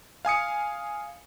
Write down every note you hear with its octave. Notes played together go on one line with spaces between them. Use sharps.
F5 G#5 D#6 C#7